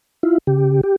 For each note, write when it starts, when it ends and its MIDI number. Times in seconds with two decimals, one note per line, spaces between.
0.23 0.38 64
0.23 0.38 65
0.47 0.81 49
0.47 0.81 67
0.83 0.96 67